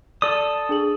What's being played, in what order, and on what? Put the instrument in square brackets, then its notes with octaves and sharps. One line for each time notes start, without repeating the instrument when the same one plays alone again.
[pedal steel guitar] A4 D#6 [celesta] D5
[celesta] D4 G#4 F#7